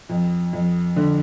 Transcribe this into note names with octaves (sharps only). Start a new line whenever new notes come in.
F2
F2
D3